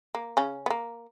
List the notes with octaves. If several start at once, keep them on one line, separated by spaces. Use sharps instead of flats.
A#3
C#3 C#4
B3
A#3